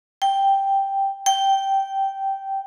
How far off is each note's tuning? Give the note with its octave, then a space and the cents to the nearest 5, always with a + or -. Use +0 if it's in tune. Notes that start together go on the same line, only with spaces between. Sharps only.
G5 +0
G5 -10